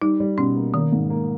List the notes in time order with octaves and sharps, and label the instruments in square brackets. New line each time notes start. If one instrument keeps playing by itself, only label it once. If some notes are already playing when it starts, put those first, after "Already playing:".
[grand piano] G3 [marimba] D#4
[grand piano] G3
[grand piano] B2 [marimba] C#4
[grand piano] A#3
[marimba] D#3 [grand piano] A#3
[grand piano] G#2
A#3